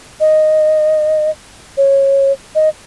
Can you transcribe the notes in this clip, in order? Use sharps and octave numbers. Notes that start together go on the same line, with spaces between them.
D#5
C#5
D#5